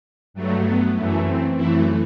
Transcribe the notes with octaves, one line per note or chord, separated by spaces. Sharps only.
G2 F#3 A3
B3
F#2 E3 A3
C4
F#2 E3 A3 E4